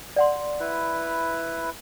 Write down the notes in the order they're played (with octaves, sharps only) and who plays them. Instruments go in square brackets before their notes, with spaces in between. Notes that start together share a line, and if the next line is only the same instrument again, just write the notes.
[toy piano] D5 F#5 C6
[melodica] E4 B4